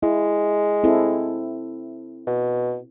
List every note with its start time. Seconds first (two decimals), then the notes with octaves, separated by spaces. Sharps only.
0.03 G#3 E4
0.84 C4 E4 A4
2.27 B2